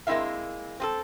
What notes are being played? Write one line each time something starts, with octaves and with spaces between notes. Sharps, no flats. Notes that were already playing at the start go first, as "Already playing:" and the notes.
G#3 A#3 C4 E4 E5 F5
C4 G#4 A4